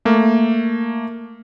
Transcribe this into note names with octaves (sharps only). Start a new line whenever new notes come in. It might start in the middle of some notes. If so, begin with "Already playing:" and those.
A3 A#3